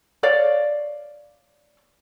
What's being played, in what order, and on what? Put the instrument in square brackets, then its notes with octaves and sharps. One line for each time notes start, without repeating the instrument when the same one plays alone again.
[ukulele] C#5 D5 F5